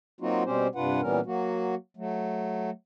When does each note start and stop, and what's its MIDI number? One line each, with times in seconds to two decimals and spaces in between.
0.21 0.43 54
0.21 0.43 58
0.21 0.43 60
0.21 0.43 63
0.21 0.43 65
0.21 0.43 66
0.45 0.67 47
0.45 0.67 55
0.45 0.67 60
0.45 0.67 61
0.45 0.67 67
0.45 0.67 72
0.75 1.01 43
0.75 1.01 48
0.75 1.01 62
0.75 1.01 65
0.75 1.01 71
0.75 1.01 78
1.01 1.20 46
1.01 1.20 52
1.01 1.20 55
1.01 1.20 59
1.01 1.20 61
1.01 1.20 70
1.26 1.75 54
1.26 1.75 58
1.26 1.75 66
1.97 2.70 54
1.97 2.70 57